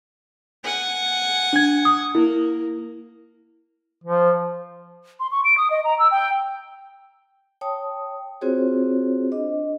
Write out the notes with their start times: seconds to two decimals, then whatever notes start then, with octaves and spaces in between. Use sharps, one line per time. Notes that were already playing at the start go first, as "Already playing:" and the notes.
0.64 F#5 G#5
1.53 D4 G#6
1.85 D#6
2.15 A#3 E4
4.04 F3
5.20 C6
5.32 C#6
5.45 D7
5.58 D#6
5.71 D#5
5.84 A#5
5.99 E6
6.11 G5
7.61 C#5 G5 A5 D#6
8.41 C4 F4 F#4 G#4 C5 C#5
9.32 D4 D#5